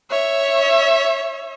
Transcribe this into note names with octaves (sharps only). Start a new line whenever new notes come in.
C#5 E5